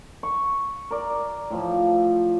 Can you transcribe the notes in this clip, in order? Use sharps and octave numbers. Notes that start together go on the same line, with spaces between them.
C#6
A#4 D5
A2 F3